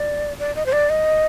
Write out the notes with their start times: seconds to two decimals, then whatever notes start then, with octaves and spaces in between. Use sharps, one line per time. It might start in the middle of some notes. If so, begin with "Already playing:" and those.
Already playing: D5
0.39 D5
0.56 D#5
0.66 C5
0.73 D5
0.90 D#5